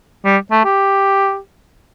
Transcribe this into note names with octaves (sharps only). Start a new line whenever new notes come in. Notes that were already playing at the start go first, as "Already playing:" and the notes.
G3
A3
G4